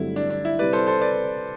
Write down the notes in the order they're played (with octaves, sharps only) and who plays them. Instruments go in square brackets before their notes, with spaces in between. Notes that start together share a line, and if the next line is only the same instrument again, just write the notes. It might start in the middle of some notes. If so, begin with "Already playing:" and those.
Already playing: [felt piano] G2 D3 F#3 A3 C4 [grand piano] E4
[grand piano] D4
D4
E4
[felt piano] C3 G3 C4 E4 [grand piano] B4 D5
[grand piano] A4 C5
A4 C5
B4 D5